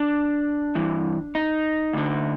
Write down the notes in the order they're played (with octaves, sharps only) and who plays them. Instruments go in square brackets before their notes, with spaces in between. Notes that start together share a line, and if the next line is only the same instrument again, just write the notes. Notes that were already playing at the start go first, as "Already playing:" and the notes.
Already playing: [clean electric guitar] D4
G2 E3
D#4
D2 D3